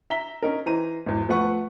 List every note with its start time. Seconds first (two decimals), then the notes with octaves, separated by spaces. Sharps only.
0.10 E5 A#5 B6 G7
0.43 C#4 D#4 A#4
0.66 E3 C5 A#5 D#7
1.06 G#1 E2
1.29 F3 A3 B3 B4 F#5 C#6